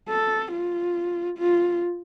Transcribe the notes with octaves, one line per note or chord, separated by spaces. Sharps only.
A4
F4
F4